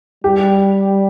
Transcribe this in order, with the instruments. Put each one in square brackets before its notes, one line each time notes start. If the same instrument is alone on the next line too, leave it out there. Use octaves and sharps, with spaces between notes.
[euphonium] G3 [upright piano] G4